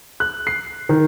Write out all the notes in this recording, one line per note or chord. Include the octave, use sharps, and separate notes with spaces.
F#6
C7
D#3